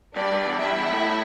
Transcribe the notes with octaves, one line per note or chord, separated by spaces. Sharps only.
G2 D4 D5
G2
E2
G2 E4 E5
E2
A2